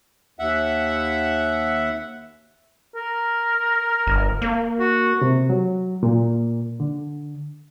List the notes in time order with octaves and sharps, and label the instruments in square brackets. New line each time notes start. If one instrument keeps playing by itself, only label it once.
[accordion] D#2 E5 F#5
[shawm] A#4
[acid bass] G1
A#3
[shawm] F#4
[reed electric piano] C3
F#3
A#2
D3